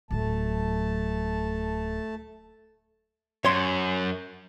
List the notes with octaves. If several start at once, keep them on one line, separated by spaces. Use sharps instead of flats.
D1 F#3 A3 A5
F#2 C#5 C6